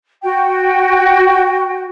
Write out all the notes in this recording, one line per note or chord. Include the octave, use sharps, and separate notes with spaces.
F#4 G5